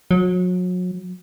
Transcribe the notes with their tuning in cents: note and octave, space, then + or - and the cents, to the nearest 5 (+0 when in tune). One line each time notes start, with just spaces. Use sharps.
F#3 -35